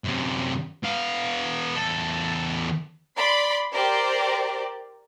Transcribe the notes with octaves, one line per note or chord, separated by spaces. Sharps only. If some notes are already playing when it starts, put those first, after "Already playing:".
F#2 C3
B3 F5
E2 A4
D5 B5 C6
G4 A#4 C5 D5